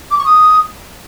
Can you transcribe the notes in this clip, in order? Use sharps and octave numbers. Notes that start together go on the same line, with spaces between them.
D6
C#6
D#6